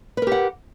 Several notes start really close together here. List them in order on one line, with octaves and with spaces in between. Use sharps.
B4 A#4 G4 F#5